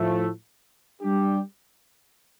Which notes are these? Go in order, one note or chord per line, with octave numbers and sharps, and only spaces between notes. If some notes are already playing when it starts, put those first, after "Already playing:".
Already playing: A2 F3 A3
G3 D4 G4